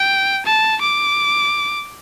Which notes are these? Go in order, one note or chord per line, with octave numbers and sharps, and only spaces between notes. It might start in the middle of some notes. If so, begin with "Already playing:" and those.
Already playing: G5
A5
D6